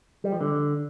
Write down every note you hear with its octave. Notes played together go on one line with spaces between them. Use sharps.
G3
F3
D3